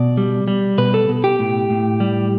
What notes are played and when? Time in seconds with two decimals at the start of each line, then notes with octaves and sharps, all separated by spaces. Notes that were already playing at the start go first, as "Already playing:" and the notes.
Already playing: B2 D5
0.17 G3
0.48 G3
0.78 B2 B4
0.94 A4
1.09 B2
1.24 G4
1.39 A2
1.70 A2
2.00 G3